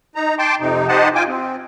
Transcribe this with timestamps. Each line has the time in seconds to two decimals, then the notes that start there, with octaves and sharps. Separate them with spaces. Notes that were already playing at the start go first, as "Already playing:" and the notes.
0.16 D#4 A#5
0.39 G5 A5 C6 D6
0.60 F2 C3 D#4
0.88 D#4 G4 C5 D#5 F#5 A5
1.15 F4 G5 G#5 D6
1.28 C4